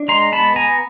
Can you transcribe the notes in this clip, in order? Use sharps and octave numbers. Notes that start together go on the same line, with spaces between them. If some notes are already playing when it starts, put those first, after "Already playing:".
Already playing: D4
G#3 A#5 C6
B3 A5 B5
B3 G#5 A#5